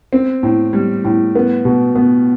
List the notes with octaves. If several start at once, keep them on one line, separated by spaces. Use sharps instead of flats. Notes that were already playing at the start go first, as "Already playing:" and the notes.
C4
A2
G3
A2
B3
B2
B3